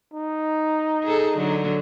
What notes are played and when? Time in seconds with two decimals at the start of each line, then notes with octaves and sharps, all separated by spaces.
0.13 D#4
1.04 G#4 A4
1.37 D3 F#3